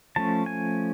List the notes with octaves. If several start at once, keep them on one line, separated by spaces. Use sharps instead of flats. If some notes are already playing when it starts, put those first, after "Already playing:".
F3 A3 C#4 A5
G#5